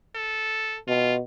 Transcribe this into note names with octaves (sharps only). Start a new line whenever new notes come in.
A4
B2 F4